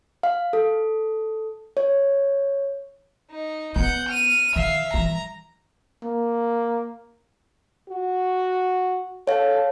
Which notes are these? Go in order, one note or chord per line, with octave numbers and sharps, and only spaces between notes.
F5
A4
C#5
D#4
B3 F#5 G6
F6 D#7
D#3 E5 F5
E3 G3 A#5
A#3
F#4
A4 C#5 F5